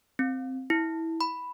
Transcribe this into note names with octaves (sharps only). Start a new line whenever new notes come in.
C4
E4
B5